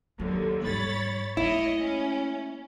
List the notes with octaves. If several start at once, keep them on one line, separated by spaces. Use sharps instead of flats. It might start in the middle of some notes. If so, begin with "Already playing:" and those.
D#2 D3 F#3
G#2 G3 C#5 B5 A6
A3 A#3 E4 C#5 D#5
C#4